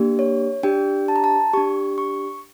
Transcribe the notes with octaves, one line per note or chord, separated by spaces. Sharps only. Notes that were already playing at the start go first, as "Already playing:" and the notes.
Already playing: A#3 D4 G4
C#5
D4 G4 G5
A5
A#5
A5
D4 G4 C#6
C#6